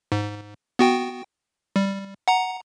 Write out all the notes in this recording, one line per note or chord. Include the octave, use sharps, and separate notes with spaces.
G#2
B3 F#4 G5
G3
F#5 A#5